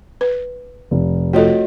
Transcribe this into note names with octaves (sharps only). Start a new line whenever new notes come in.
B4
F1
A3 F4 F#4 A4 C#5 D#5